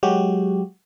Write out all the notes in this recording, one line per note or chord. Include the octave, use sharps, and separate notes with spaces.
F#3 G#3 F#4 G4